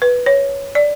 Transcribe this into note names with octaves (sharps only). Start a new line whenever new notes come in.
B4
C#5
D5